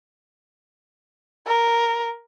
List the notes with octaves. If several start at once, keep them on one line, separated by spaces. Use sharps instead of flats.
A#4